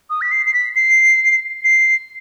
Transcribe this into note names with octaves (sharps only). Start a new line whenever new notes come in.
D#6
B6
C7
C7
B6
C7
C7